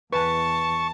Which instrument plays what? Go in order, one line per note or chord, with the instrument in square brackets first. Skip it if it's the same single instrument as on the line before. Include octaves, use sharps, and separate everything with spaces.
[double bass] E2 [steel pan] B4 G#5 [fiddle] A5 [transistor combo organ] C#6